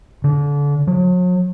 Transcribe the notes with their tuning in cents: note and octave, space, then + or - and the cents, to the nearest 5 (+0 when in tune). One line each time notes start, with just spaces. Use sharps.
D3 -30
F#3 -40